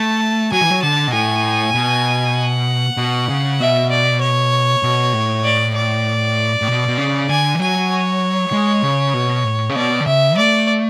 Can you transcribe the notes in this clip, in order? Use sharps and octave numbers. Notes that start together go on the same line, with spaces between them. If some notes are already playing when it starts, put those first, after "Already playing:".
Already playing: A3 A5
F#3 G#5
E3
F#3
D3 A5
B2
A2 G#5
B2
F#5
B2
C#3
B2 E5
D5
C#5
B2
A2
D5
D5
A2
B2
B2
C#3
D3 G#5
E3
F#3 G#5
C#5
G#3
C#3
B2
A2
C#3
B2 D5
D3
C#3 E5
A3 D5